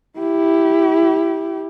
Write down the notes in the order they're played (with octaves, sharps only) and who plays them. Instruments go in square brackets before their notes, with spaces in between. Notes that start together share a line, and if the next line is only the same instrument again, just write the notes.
[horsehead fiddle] E4 G4